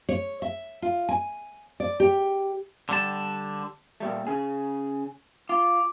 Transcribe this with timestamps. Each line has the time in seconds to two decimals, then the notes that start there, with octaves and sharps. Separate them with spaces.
0.09 C#5
0.42 E5
0.82 F4
1.09 G#5
1.80 D5
2.00 G4
2.89 D3 G3 A5
4.00 A#2 G3 A3
4.27 C#3 C#4 G#4
5.49 F4 D6